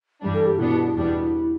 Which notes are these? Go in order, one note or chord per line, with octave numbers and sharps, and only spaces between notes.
G2 E3 G3 D4
A4
G4
B2 B3 D4 E4
E2 B2 G3 B3 D4